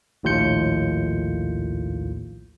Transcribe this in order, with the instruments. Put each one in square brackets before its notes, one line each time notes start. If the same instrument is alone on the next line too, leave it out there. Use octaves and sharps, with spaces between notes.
[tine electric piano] A#1 D#2 A2 F4 G6 C#7